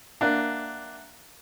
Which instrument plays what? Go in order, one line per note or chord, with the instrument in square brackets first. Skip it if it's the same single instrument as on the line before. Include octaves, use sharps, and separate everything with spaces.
[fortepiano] A#3 D4 [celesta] E5 F#5 F#6